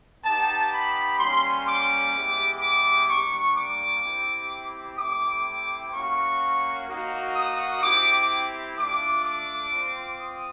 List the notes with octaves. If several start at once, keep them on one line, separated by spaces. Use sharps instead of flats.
B3 D#4 G4 A5
B5
G3 A#3 C#4 C6
D6
G#3 B3 E4 G4
D6
G3 A#3 D4 C#6
D6
C4 E4 G4
A3 C4 E4 G4 D6
A#3 C#4 F#4 C#6
A#3 D#4 F#4
D#6
C4 E4 G4 D6
A3 D4 F4 D6
D6
C4 F4
D#6